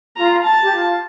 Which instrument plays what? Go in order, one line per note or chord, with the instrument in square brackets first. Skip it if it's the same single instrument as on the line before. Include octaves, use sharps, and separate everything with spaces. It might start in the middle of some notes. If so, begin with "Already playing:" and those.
[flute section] F4 [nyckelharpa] A#5
[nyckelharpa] A5
[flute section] G4
F4